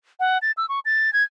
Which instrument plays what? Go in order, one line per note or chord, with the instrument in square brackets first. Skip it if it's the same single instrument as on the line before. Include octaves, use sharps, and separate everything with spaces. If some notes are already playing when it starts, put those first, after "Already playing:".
[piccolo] F#5
A6
E6
C#6
A6
G#6